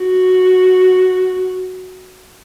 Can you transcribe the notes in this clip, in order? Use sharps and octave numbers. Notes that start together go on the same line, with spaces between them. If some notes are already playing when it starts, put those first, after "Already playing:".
Already playing: F#4